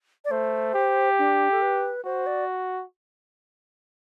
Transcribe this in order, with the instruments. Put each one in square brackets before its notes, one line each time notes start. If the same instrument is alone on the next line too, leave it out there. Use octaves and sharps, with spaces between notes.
[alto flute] D5
[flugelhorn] A3 [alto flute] C5
[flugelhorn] G4
[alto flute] D4
A4
B4
[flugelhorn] F#4 [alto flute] C5
[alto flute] D5